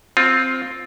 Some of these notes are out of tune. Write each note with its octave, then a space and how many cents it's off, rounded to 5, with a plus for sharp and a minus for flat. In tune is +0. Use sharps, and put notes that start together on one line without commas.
C4 +0 F4 +10